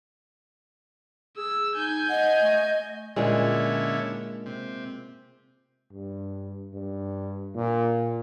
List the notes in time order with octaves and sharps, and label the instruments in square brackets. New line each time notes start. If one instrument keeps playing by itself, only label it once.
[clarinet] G#4 [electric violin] E6
[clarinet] D#4 [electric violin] G#5 G6
[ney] D#5 [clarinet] F#5
[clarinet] A3
[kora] A#2 G#3 [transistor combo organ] D3 C#4 E4
[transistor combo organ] C3
[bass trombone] G2
G2
A#2